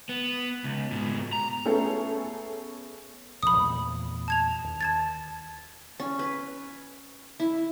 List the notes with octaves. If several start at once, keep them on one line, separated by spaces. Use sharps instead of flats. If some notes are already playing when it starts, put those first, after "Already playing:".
B3
C#2
G#2 B2
A#5
A3 B3 C#4 G#4 A4
A#1 F2 B5 D#6
E2 A#2 A3
A5 G#6 F7
D#2
A5 G#6 A6
C#4
B4
E4